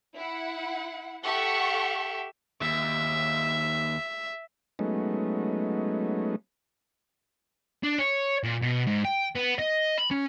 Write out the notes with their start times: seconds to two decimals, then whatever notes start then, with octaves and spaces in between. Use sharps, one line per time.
0.15 E4 F#5
1.24 G4 A4 E5 F#5 C#6
2.62 D#2 E5
4.79 F#3 G#3 A3 B3 C#4 D#4
7.83 D4
7.98 C#5
8.43 A#2
8.62 B2
8.87 G#2
9.05 G5
9.35 B3
9.59 D#5
9.98 B5
10.11 C#4